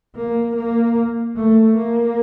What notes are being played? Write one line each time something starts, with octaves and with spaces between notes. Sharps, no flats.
A#3
A#3
A3
A#3